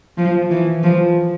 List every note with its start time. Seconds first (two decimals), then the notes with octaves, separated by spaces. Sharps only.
0.18 F3
0.51 E3
0.83 F3